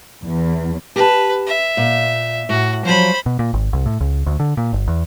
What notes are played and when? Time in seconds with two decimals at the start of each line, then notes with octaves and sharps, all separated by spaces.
0.23 E2
0.96 G4 B4 A5
1.47 E5
1.77 A#2
2.49 A2 F#4
2.85 F3 F#3 C5 B5
3.26 B2
3.39 A#2
3.53 G#1
3.73 C2
3.86 A2
4.00 C#2
4.26 D2
4.40 D3
4.57 A#2
4.73 G1
4.87 E2